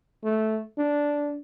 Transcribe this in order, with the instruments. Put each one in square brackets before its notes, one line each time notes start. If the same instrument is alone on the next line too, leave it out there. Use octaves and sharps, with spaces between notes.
[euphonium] A3
D4